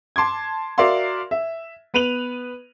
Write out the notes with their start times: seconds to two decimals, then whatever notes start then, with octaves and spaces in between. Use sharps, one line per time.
0.16 A5 C6 D6 G#6
0.78 F#4 A#4 D5 E5 F5 C6
1.31 E5
1.94 B3 B4 D#7 F7 F#7